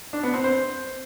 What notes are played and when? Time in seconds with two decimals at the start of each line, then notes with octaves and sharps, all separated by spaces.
0.13 D4
0.23 B3
0.34 C4
0.44 C5